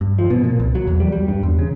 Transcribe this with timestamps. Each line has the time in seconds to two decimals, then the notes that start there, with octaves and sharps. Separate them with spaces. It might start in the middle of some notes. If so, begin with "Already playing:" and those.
0.01 G2
0.19 F3
0.30 B2
0.44 A#2
0.60 C2
0.75 F#3
0.87 E2
1.00 G3
1.12 G3
1.28 G2
1.43 E2
1.59 C#3